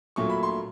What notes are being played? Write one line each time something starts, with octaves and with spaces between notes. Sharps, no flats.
A#2 F#3 A3 C#6
B5
C6